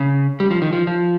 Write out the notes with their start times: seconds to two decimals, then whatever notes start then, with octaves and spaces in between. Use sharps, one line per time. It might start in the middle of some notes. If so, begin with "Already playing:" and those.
Already playing: C#3
0.40 G3
0.51 F3
0.62 D#3
0.73 F3
0.87 F3